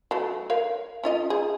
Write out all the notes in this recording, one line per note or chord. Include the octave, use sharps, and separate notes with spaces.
F#3 A3
A#4 C#5 F5
C#4 F4 D#5
G#4